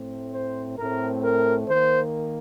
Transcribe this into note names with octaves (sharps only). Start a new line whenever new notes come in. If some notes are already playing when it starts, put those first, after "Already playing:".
Already playing: A2 A3 C4
C5
A2 A3 C4 A#4
A#4
D#3 A#3 C5